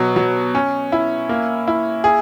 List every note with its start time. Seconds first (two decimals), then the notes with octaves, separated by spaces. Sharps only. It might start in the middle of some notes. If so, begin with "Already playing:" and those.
Already playing: B2 F#3
0.16 F#3
0.55 C#4
0.92 E4
1.29 A#3
1.68 E4
2.04 G#4